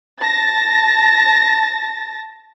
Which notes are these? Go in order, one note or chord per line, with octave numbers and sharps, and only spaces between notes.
A5 A6 A#6